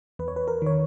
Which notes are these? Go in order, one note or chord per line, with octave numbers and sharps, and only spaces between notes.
E2 B4
C#5
B4
A#4
D#3 C#5